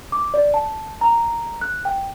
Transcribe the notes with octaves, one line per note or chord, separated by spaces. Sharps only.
D6
D5
A5
A#5
F#6
G5